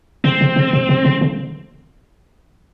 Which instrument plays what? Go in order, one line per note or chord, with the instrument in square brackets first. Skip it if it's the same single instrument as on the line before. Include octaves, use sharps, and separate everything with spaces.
[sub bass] C3 [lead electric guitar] C4
[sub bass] C3
C3
B2
B2
C3
C#3